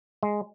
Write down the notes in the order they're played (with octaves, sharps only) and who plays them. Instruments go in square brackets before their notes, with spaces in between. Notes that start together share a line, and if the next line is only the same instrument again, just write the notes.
[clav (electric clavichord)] G#3